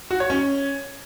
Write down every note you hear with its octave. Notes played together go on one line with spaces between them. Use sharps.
F#4
C#5
C#4